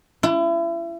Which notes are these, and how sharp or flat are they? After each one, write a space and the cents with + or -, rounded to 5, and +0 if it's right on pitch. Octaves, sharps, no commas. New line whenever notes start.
E4 +35